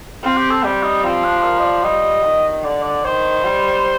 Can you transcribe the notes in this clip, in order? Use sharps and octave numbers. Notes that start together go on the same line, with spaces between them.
C4 F4
G4
A4
G3 G4
D#4
F3 C4
D4
A#4
D#5
D5
G3 D#5
D#3
D3 D5
D5
D#3 C5
G3